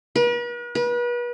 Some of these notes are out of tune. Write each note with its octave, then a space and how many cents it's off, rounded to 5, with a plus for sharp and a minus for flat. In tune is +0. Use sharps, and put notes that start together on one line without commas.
B4 -45
B4 -35